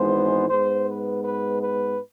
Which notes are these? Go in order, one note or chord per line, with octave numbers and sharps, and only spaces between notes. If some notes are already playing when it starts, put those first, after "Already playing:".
Already playing: G#1 G#2 E3 G#3 B3 C5
G#2 G#3 B3 C5
B4
B4
B4